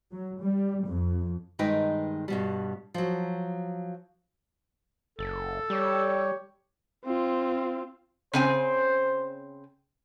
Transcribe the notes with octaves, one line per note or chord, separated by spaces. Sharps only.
F#3
G3
F2
G2 D#3 G#3 D#4 B4 G5
G2 B2 G3
F3 F#3
F#1 A4
G3 G4 C#5
C4 F4
C#3 C4 C5 G#5